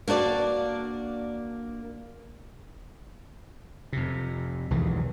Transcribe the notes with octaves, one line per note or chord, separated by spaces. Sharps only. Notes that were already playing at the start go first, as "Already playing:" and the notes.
A#3 D4 F#4 D5
F2 C3
B1 E2 D#3 E3